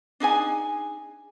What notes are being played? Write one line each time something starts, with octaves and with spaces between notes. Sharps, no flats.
D4 D#4 G#4 G#5